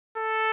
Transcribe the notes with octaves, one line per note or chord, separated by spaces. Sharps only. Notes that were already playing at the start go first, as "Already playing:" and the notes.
A4